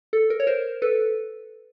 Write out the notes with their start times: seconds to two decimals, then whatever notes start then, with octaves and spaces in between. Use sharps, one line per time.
0.13 A4
0.30 A#4
0.40 C#5
0.47 A#4 C5
0.82 A4 B4